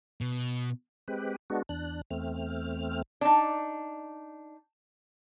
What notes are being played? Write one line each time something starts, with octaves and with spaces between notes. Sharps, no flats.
B2
G#3 C4 G4 B4
G#3 B3 D4 F#4
E2 D4 F#6
E2 A3 C4 F6
D4 D#4